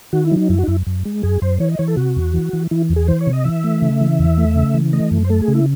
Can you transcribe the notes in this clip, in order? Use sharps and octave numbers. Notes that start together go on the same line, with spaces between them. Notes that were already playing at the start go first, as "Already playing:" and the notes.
D#3 F#4
E4
F#3
D#4
F#2 E4
F#4
D#4
F#2 E4
F#2
G#3
F#2 G#4
F#2 C5
E3 C#5
D#5
E3 C#5
A4
C3 F#4
E2
E3
E3
E3 E4
E2
G#4
E3 C5
C#5
C3
D#5
E3 E5
A3
C#3
E3
E2
A3
C#3
E3
A3 D#5
F#2
C5
A3 A4
G#4
C#3
E4